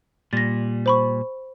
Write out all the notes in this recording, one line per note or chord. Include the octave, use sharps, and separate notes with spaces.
A#2 G3 A6 A#6
C5 B5 C#6